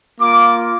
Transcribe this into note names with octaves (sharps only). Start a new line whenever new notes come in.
A#3 F4 D6